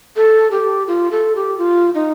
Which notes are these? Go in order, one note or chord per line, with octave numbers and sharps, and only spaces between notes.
A4
G4
F4
A4
G4
F4
D#4